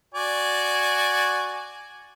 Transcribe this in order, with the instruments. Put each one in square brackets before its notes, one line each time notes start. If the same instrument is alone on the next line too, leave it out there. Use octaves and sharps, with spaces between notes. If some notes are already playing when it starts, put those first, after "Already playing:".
[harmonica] F#4 D5 G#5